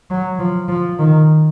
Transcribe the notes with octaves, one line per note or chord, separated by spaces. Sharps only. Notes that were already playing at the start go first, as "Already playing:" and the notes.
F#3
F3
F3
D#3